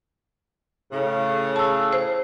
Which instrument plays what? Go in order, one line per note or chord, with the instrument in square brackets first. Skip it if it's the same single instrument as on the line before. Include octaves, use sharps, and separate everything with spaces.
[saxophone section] A2 C#3
[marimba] A5 E6
C5